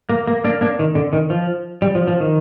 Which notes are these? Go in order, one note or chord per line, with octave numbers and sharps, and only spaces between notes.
A#3
A#3
A#3 D4
A#3 D4
D#3
D3
D#3
F3
G3
F3
F3
D#3